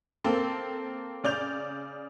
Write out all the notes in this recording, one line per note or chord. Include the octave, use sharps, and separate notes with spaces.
A#3 C4 A4
C#3 D5 G6 F7